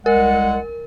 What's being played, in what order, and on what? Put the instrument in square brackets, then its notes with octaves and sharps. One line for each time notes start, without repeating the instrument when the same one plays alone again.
[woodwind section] C2 G#3 F#5 [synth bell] A#4